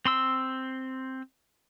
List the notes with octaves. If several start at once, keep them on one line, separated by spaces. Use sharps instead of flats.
C4 C6 E6